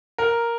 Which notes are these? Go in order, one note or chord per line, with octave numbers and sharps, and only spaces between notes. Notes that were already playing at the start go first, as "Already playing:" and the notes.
A#4